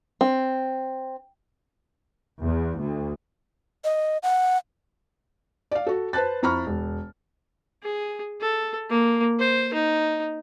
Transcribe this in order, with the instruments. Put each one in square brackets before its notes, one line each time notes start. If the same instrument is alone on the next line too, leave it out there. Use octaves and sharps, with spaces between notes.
[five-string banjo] C4
[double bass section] E2
D2
[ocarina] D#5
F#5
[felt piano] D5 F5
F#4 A4
B4 C5 A5 F#6 A6
F2 E4 A#5 B5 C#6 F6
E1
[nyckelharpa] G#4
A4
A#3
C5
D#4